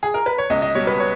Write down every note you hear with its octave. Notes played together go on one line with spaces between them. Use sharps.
G#4
A#4
B4
C#5
C#2 D#5
D#5
B2 G3 C#5
B4
C#5